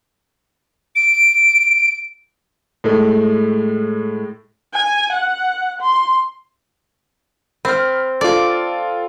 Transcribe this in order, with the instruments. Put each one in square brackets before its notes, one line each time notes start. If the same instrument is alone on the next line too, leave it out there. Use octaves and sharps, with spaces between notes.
[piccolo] D7
[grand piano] A2 G#3 A3
[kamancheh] G#5
F#5
C6
[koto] C4 [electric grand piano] B5 F6
[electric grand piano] F4 A4 [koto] D5